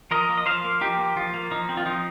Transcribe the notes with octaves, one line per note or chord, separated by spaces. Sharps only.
F3 A#4 D#5
A#3
D#5
F3 C5 F5
A#3
F3 D#4 G4
A#3
F3 F4
A#3
F3 D#4
C4
F4
F3 D#4